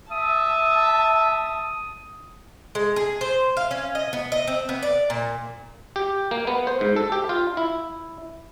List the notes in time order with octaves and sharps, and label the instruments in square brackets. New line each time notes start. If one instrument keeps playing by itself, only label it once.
[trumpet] E5 [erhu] A5 [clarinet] D#6
[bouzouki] G#3
G#4
C5
F5
C#4
D#5
B3
D#5
C4
B3
D5
A#2
[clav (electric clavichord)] G4
A#3
B3
C5
G#2
A4
G4
F4
E4